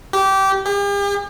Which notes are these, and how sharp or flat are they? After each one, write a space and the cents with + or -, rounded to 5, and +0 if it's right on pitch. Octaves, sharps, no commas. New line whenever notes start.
G4 -20
G4 +45